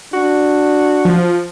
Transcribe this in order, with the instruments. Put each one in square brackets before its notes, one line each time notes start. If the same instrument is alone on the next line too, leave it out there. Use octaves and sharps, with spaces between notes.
[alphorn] D4 [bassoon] F#4
[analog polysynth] F3